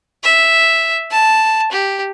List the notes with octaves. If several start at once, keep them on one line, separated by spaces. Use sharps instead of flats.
E5
A5
G4